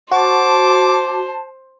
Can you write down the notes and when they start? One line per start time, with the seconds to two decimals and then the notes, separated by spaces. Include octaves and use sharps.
0.11 F#4 C5 A5 D6